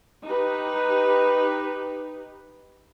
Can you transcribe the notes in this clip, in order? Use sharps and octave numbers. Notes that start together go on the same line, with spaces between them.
D#4 G4 B4